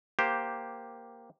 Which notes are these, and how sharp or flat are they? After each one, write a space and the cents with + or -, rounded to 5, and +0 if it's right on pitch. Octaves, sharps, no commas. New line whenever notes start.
A#3 +5 G4 +0 C5 +5